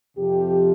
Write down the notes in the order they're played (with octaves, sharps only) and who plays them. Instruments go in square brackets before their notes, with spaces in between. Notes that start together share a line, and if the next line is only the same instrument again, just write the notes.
[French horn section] F2 C3 F3 G4